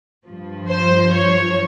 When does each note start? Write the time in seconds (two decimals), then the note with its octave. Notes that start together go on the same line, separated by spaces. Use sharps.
0.25 G2 F3
0.69 C5
1.13 C#5